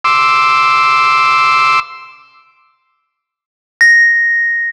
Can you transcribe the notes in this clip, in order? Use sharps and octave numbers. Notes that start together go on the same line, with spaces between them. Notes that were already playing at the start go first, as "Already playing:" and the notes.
C6 D6 E6
A#6